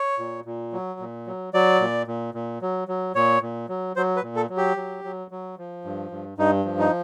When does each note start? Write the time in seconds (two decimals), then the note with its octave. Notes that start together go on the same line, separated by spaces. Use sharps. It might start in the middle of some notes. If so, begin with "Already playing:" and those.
Already playing: C#5
0.19 A#2
0.45 A#2
0.73 F#3
1.00 A#2
1.27 F#3
1.54 F#3 D5
1.80 A#2
2.08 A#2
2.34 A#2
2.62 F#3
2.88 F#3
3.15 A#2 C#5
3.42 A#2
3.69 F#3
3.96 F#3 C5
4.16 B4
4.22 A#2
4.36 A4
4.50 F#3
4.57 G4
4.77 F#3
5.04 F#3
5.31 F#3
5.58 F3
5.85 G2
6.11 G2
6.38 G2 D#4
6.65 F3
6.79 D#4